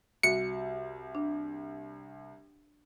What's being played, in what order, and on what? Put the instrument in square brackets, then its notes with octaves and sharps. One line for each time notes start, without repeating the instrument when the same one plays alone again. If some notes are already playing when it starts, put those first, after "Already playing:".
[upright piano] C2 [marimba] F#4 [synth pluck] C#7
[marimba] D4